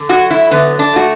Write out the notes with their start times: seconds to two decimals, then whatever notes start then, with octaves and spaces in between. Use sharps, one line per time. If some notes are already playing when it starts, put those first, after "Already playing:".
Already playing: D3
0.09 F#3 F#4
0.31 E4
0.51 D3 B3
0.79 D4
0.93 A3 F#4